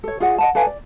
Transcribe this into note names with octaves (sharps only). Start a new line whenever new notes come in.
A4 C#5
F4 G#4 D5 F#5
D#5 F#5 A5
A4 B4 F5 G#5
D5